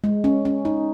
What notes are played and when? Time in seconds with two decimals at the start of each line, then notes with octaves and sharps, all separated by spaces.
0.04 G#3
0.24 C#4
0.45 C#4
0.65 D#4